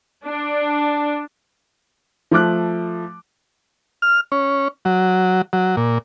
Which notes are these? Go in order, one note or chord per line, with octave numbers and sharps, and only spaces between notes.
D4
F3 A3 D6 F#6
F6
C#4
F#3
F#3
A#2